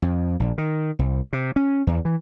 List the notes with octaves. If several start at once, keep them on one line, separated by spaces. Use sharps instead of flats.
F2
A#1
D#3
C2
C3
C#4
E2
E3